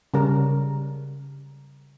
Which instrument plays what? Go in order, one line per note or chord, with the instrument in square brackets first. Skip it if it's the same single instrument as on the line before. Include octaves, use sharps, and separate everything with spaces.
[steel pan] C#3 G3 A#4